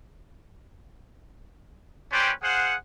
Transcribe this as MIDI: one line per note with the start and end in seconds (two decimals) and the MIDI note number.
2.12 2.31 55
2.12 2.31 61
2.12 2.31 71
2.12 2.31 72
2.12 2.31 74
2.12 2.31 79
2.43 2.75 68
2.43 2.75 72
2.43 2.75 77
2.43 2.75 78